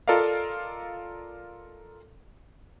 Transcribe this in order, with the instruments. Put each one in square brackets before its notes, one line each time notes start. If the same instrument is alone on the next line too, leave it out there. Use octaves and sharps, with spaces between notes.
[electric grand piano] F4 A4 A#4 D5 D#5 F5